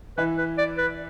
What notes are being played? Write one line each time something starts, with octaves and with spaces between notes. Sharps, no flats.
E3 E4 B4
B4
D5
B4